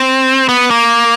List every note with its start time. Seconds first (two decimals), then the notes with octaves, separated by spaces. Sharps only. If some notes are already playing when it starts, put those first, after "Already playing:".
Already playing: C4
0.49 B3
0.71 A#3